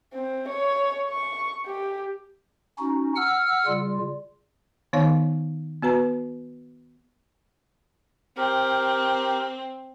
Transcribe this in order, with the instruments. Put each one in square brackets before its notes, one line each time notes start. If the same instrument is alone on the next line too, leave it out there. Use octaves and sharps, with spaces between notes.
[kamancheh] C4
C#5
C#6
G4
[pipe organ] C#4 D#4 F#4
F#5 E6 F6
C#3 G3 F4
[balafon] D#3 B3 D#4 C#5 F5
B3 F#4 B4 A#5
[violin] C4 [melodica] G4 A#4